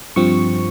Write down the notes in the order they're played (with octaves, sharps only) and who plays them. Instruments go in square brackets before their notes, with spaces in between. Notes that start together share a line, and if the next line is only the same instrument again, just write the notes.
[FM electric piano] G2 F3 C4 C#6